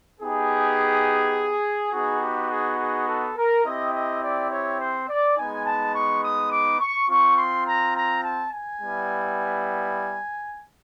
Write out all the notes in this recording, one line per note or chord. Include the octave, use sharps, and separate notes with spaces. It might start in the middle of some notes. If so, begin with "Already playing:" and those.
B3 D#4 G4 G#4
B3 D#4 F#4 G#4
G4
G#4
G#4
A4
A#4
C4 E4 G4 D#5
D#5
D5
C#5
C5
D5
G#3 B3 D#4 G#5
A5
C#6
D#6
D6
C#6
C4 F4 C#6
C6
A#5
A#5
A5
G#5
G3 B3 E4